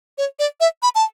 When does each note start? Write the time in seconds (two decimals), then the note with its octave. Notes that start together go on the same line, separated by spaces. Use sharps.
0.18 C#5
0.39 D5
0.60 E5
0.83 B5
0.95 A5